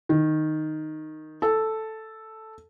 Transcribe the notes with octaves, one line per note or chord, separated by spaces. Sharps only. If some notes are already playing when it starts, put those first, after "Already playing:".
D#3
A4